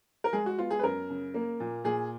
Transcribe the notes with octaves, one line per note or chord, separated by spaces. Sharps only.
A#4
G#3 G#4
F#4
B3 F4
G#4
B4
F#2 A#4
C#3
A#3
A#2
A#2 G#4